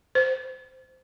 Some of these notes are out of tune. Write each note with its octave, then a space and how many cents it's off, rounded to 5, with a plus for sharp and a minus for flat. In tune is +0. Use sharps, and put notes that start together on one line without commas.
C5 -15